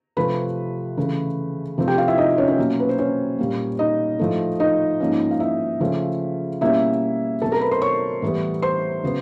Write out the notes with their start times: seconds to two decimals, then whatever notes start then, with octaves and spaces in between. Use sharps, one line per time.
0.17 C3 F3 A3 B4 B5
0.97 C#3 E3 A3
1.78 C3 F3 A3 C4
1.87 G4 G5
1.98 F4 F5
2.08 E4 E5
2.18 D#4 D#5
2.38 C#4 C#5
2.48 C#4 C#5
2.58 B2 F#3 A#3
2.80 B4
2.89 C5
2.99 C#4 C#5
3.39 A#2 G3 A#3
3.79 D#4 D#5
4.19 A2 F3 A3
4.60 D#4 D#5
5.00 G#2 F3 A#3 C#4
5.31 F5
5.40 E4 E5
5.80 C#3 F3 A3 C#4
6.61 B2 G3 A#3 C#4 E4 E5
7.42 B2 F#3 A3 C4 A4 A5
7.52 A#4 A#5
7.61 B4 B5
7.71 C5 C6
7.82 C#5 C#6
8.22 A2 E3 G3 B3
8.62 C5 C6
9.04 C#3 F#3 B3